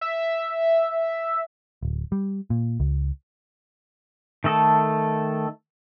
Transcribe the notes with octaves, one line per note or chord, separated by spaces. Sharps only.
E5
D1
G3
A#2
C#2
D#3 A3 A4